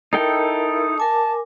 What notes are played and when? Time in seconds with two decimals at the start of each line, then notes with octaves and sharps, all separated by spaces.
0.13 D#4 E4 A4 A#4 G5
0.98 A#4 G#5 A5 D6